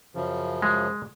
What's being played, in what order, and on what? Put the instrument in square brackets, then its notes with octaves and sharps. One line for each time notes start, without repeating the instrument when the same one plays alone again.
[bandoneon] F#2 C#3 F3
[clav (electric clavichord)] G#3